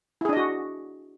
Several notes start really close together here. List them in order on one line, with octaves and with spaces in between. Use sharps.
E4 G#4 D4 D#5 F#4